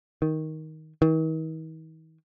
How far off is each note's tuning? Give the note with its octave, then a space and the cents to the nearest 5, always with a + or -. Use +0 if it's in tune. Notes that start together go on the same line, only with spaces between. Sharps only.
D#3 +10
D#3 +45